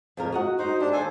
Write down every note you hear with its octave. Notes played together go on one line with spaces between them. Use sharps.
F2 A#2 A#4
F#4 D#5 F#5
D#4 F#4 C5
D4 G4 A#4
D#2 A4 C5 G#5